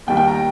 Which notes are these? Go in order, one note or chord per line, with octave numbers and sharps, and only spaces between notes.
D#2 D#3 G3 G5
G5
A#5